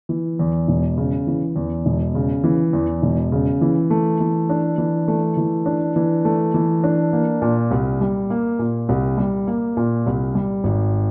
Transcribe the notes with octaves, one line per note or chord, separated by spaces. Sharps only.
E3
E2
E1
C#3
E3
E2
E1
C#3
E3
E2
E1
C#3
E3
A3
E3
D4
E3
A3
E3
D4
E3
A3
E3
D4
A#3
A#2
C2
G3
A#3
A#2
C2
G3
A#3
A#2
C2
G3
G#1